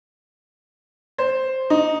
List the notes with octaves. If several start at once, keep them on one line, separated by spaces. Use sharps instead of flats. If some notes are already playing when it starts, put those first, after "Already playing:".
C5
D#4